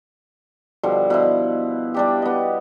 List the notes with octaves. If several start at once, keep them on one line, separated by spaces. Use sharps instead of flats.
B2 D3 F3 G3
B2 F3 E4
G3 D4 G4
B3 D#5